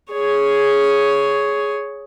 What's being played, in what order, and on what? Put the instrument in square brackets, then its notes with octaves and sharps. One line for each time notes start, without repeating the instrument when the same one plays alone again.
[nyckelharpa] G#4 C#5